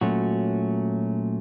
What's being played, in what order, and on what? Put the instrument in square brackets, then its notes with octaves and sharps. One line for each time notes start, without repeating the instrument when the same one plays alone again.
[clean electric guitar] A#2 F#3 A3 C#4 F#4